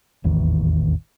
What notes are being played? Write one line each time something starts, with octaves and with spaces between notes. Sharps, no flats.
D#1 A1 E2 D#3